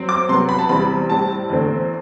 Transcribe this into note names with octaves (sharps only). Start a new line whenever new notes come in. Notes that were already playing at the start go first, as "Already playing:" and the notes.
Already playing: F#3 C4
D6
C3 F#3 B3 C6
B5
A5
E2 C3 G3 C4 B5
A2 G3 C4 A5
E2 D3 A3 C4